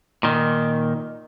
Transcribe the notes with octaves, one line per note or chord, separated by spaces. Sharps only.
A#2 D#3